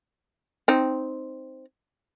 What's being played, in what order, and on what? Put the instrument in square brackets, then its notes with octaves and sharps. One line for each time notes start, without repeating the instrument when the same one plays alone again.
[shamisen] C4 D#4